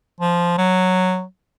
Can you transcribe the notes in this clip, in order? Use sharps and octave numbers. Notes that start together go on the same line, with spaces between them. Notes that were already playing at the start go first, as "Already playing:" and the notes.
F3
F#3